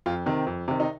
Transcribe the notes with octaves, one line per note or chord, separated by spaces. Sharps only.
F2 F4
C3 D#3 C4
F2
C3 D#3
D#4